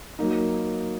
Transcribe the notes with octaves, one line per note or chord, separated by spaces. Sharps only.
F#3 A#3 D#4